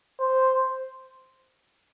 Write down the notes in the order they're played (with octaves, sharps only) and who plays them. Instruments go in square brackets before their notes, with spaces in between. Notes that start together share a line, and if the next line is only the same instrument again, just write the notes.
[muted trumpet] C5